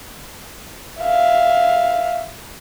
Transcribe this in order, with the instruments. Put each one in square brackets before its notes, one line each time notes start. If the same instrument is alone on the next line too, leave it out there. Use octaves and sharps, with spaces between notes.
[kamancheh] E5 F5